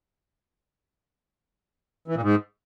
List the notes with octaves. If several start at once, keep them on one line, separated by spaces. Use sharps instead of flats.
E3
A#2
G#2